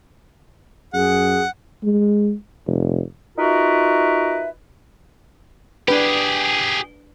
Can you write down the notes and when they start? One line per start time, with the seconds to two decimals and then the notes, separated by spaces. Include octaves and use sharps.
0.94 F#2 G#4 F#5
1.83 G#3
2.67 F1
3.38 D#4 F4 F#4 A#4 B4 E5
5.88 D4 G4 G#4 B4